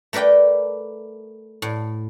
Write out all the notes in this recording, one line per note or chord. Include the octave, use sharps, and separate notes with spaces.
A3 A#4 B4 D5 G5
A2